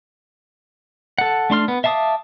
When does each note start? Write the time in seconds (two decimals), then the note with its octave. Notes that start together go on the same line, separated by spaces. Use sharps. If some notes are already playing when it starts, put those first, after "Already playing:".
1.18 A4 F#5
1.50 A3 D4 C6 F6
1.68 B3
1.84 E5 F5 A5 D6 D#6